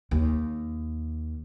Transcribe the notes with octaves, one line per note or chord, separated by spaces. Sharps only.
D#2